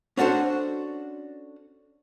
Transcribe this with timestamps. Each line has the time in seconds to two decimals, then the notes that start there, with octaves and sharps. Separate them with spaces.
0.17 C#4 D4 F#4 A4 C5